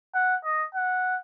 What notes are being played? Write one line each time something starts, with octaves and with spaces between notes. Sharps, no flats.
F#5
D#5
F#5